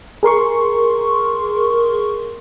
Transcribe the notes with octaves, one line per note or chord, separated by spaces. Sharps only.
G#4 A#4 C6 C#6